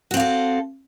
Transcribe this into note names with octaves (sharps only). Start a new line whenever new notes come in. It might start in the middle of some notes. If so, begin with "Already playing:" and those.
C4 F#4 A4 F5